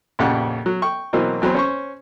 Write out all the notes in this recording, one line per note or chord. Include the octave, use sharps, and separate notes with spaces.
A#1 F2 C#3 G4 F#5
F#3
G5 C#6
B2 E3 F#3 A#3 C4
E2 F#3 C4 B5
C#4 C5 C#6